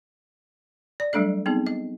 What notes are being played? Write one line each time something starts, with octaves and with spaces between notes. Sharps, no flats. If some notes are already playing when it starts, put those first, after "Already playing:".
D5
F#3 G3 A3 D4 A4 D#5
B3 C4 D#4 G#4
D#5